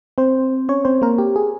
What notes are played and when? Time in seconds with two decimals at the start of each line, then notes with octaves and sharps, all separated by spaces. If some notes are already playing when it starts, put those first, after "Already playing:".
0.18 C4 C5
0.69 C#4 C#5
0.85 C4 C5
1.02 A#3 A#4
1.18 G4
1.36 G#4